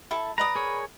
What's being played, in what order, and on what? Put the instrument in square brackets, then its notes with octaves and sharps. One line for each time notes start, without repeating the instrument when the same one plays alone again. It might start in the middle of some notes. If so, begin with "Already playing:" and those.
[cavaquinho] E4 A4 A5
[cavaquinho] B4 D5 D#6 [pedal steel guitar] A#5
[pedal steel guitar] G#4 A#4 C#5